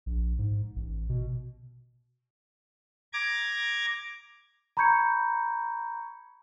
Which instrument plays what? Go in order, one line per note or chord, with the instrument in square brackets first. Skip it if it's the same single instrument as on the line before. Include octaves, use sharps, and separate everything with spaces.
[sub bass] A#1
G#2
A1
B2
[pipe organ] A#5 D6 G#6
[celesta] A#5 B5 C#6 G6 G#6 C#7